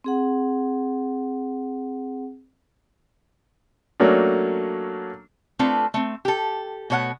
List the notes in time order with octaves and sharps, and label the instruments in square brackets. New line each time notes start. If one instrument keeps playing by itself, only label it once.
[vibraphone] C4 G#4 F#5
[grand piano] F#3 A3 A#3 C#4 D4
[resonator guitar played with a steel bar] A3 C4 D4 F4 A4 B4
A3 C4
G4 A4
B2 A3 C#5 F5 F#5